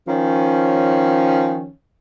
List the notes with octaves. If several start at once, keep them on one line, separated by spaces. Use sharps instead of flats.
D#3 F3 C#4